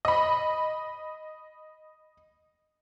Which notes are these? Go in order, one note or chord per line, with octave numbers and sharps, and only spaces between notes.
D#5 B5